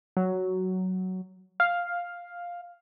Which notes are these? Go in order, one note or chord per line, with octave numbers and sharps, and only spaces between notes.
F#3
F5